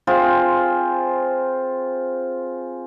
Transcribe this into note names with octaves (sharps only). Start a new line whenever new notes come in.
C4 F4 G#4 C5